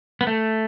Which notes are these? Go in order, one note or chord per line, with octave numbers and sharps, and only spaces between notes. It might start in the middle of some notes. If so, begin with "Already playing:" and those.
B3
A3